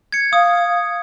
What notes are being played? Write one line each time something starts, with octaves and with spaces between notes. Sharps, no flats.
G#6 C#7
F5 D#6